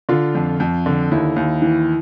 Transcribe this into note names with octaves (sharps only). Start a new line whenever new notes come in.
D3 F4
F2
F2
D3
D#2 E4
D#2
E3